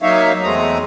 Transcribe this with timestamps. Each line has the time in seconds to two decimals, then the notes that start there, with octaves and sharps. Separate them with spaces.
0.02 F#3 A#3 D#4 C#5 E5 F5
0.43 E2 G#3 A3 C4 A#5 D#6